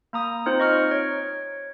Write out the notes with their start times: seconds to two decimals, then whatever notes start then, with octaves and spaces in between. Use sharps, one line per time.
0.13 A#3 A#5 D#6
0.46 C4 D#4 F4 C5
0.60 D#5 C#6 F6 C#7
0.91 C#5